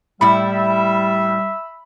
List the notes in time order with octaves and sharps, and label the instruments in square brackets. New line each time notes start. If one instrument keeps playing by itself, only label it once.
[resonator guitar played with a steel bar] A2 E4 [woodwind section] G3 [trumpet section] E5 [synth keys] B5